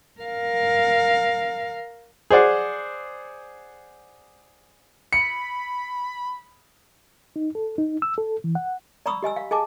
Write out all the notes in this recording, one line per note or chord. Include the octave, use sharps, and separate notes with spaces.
A#4 F5
G#4 C5 D5 F#5
B5 C#7
D#4
A4
D#4
E6
A4
E3
F#5
D5 A#5 B5 C#6 D#6 E6
G4 D#5 G#5 E6
F5
G#4 D#5 G#5 A5 D6